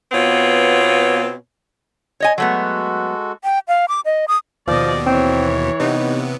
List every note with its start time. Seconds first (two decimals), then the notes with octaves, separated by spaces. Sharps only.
0.12 B2 B3 C4 F4 C#5
2.20 C#5 D#5 G#5
2.38 F#3 G#3 A3 B3 F#4 A4
3.43 G5
3.68 F5
3.88 D6
4.05 D#5
4.28 D#6
4.68 D#2 B2 F3 D5 D#5
5.07 E3 C4 C#5
5.80 C3 B3 D#4